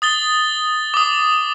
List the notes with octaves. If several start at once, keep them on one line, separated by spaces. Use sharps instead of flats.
D#6 A6 G7
D6 D#6